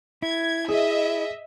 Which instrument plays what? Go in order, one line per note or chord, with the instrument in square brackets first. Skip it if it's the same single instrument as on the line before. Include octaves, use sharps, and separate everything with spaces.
[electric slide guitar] E4 [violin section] G#6
[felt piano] G#4 [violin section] D#5 E5